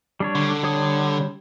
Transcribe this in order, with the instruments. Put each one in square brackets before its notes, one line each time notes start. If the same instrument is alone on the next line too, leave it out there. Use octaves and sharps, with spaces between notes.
[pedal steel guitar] G3 D4 C#5
[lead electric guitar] D3
[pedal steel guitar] G3 C#5 D#6